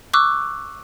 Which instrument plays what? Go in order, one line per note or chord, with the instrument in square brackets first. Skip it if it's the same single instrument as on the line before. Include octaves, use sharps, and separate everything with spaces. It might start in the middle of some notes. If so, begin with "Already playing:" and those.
[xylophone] C#6 D6 E6 F#6